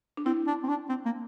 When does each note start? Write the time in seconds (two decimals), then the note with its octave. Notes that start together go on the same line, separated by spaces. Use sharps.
0.17 D4
0.26 C4 E4
0.47 D4
0.63 C4
0.68 D4
0.89 C4
1.05 A#3